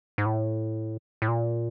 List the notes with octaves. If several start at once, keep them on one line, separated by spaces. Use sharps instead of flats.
G#2
A2
A2
A#2